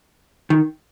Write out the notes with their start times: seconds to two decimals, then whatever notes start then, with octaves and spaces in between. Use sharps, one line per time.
0.50 D#3